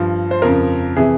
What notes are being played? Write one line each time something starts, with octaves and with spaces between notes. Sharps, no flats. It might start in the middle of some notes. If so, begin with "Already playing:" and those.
Already playing: G2 F3
C5
F2 C#3 F3 A#4
C3 E3 G#4